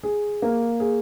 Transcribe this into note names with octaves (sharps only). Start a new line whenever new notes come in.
G#4
A#3
G#4